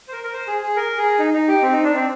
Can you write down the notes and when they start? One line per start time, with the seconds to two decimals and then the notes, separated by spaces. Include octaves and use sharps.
0.08 C5
0.12 A#4
0.24 A#4
0.33 C5
0.48 G#4
0.62 G#4
0.76 A#4
0.98 G#4
1.19 D#4
1.34 D#4
1.48 G4
1.62 C4
1.73 D#4
1.84 D4
1.94 C4